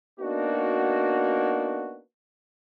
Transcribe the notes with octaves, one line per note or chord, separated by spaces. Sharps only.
A#3 B3 D4 D#4 F#4